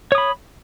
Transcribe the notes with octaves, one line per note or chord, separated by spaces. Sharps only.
C#5 B5 D#6